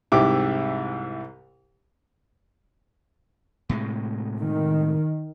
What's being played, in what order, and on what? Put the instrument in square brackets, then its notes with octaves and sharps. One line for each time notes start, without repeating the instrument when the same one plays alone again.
[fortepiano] C2 G#2 E4 G4 D6
[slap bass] A2 C3 G#3
[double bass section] D#3